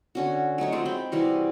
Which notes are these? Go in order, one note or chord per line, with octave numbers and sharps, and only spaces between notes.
D3 C#4 F#4
F#3 A3 D#4 C#5
F#3 G#3 C4 F4
C4 G5 B5
C3 E3 G3 F#4